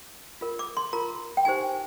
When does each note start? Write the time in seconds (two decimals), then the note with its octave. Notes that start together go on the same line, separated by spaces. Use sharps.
0.41 F4 A#4
0.59 D6
0.77 C6
0.93 F4 A#4 A#5
1.37 G5
1.45 D#4 G4 C5 G#5